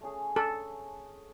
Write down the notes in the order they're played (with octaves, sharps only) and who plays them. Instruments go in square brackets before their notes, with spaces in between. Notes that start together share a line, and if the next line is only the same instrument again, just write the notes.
[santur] A3 C#4 G#4
[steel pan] A4